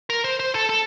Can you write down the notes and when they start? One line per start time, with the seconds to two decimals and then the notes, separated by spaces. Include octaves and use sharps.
0.10 A#4
0.24 C5
0.40 C5
0.55 A4
0.69 A4